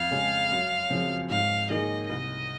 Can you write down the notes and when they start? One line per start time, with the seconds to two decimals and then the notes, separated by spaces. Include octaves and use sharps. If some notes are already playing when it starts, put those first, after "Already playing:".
Already playing: F2 F5
0.11 C#3 G#3 C#4 G#4
0.51 F#2
0.90 C#3 F3 C4
1.30 G#2 F5
1.70 D#3 A#3 D#4 G#4 D#5
2.09 C2 D#5